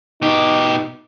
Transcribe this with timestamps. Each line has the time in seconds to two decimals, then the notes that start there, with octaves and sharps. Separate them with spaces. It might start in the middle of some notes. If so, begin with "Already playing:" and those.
0.22 B2 D#4 G4